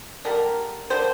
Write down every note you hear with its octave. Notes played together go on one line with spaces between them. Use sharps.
D3 G3 A#3 A#4
D3 G3 A#3 C5